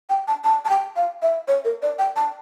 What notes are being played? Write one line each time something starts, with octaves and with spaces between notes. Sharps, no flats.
G5
A5
A5
A5
G5
F5
E5
C#5
A#4
D5
G5
A5